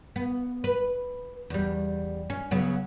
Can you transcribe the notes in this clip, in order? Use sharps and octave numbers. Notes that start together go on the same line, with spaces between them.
B3
B4
E2 G3
C#4
C#3 F#3 B3